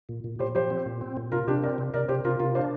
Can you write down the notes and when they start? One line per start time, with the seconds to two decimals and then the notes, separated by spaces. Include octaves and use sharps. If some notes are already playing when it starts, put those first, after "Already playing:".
0.09 A#2
0.24 A#2
0.39 A#2 G4 C5
0.55 F3 G4 C5
0.70 C4
0.86 A#2
1.01 C4
1.17 A#2
1.32 C3 F4 A#4
1.47 C3 D4 G4
1.62 C4 A#4 D5
1.78 C3
1.94 C3 A#4 D5
2.08 C3 G4 C5
2.24 C3 F4 A#4
2.39 C3 F4 A#4
2.55 D4 C5 F5